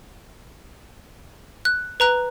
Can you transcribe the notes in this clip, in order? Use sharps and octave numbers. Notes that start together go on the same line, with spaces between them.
F#6
B4 A#5 F#6